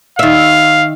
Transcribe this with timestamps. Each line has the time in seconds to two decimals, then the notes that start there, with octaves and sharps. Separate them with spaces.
0.19 D#3 E5 F5